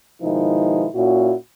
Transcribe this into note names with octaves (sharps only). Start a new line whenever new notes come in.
B2 D#3 F3 G#3 D#4 E4
A#2 C#4 E4 F#4